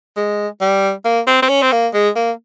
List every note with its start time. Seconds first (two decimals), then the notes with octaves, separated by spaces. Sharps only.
0.17 G#3
0.61 G3
1.05 A#3
1.27 C4
1.42 C4
1.49 C#4
1.62 C4
1.72 A#3
1.94 G#3
2.16 A#3